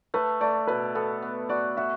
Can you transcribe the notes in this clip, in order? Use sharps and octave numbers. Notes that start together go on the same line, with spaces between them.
A3 B4
A3 D5
B2 B4
B3 A4
B3
F#4 D5
F#4 E5